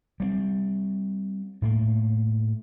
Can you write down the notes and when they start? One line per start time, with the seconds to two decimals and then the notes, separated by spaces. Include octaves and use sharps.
0.20 G3 A#3 C4
1.62 A2 A3 A#3